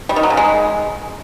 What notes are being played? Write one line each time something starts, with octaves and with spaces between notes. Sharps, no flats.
G3
D#3
F#3
C#3
G#3